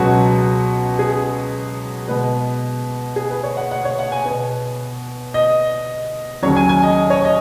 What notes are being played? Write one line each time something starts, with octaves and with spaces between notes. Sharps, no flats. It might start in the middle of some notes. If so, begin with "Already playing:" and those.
Already playing: C#2 B2 F#3 B3 F#4
G#4
B2 G#3 B3 B4
G#4
B4
C#5
F#5
F#5
C#5
F#5
G#5
B2 B3
D#5
D#2 C#3 F#3 C#5
G#5
G#5
D#5
C#5
D#5